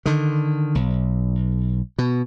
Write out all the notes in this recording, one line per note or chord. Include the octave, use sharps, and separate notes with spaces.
D3 D#3
B1
B2